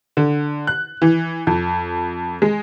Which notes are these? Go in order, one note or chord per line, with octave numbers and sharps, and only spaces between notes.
D3
F#6
E3
F2
G#3